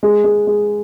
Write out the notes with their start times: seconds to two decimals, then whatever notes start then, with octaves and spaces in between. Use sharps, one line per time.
0.03 G#3
0.24 G#3
0.47 G#3